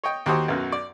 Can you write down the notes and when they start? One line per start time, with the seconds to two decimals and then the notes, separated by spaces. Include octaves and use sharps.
0.04 C#5 D#5 G5
0.26 D#2 F#4 G4 C5 C#5 D#6
0.48 B1 F#2 F#4
0.72 D5